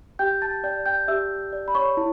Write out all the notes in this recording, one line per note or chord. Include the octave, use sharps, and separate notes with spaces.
G4 G5 G6
A5 A6
D5 G5 G6
G5 G6
G4 E5 E6
D5
B5
C#5 C#6
E4